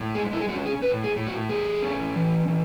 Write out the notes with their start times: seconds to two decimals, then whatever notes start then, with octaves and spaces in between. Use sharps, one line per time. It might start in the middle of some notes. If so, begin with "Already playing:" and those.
Already playing: A2
0.15 G#3 G#4
0.33 E4
0.40 G#4
0.48 C#4 F#4
0.66 G#4
0.82 A2 B4
1.04 G#4
1.16 A2
1.27 F#4
1.49 A3 G#4
1.82 C#4
2.15 E3
2.48 E3